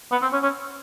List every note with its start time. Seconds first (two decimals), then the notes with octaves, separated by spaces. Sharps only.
0.11 B3
0.22 C4
0.32 C#4
0.43 C#4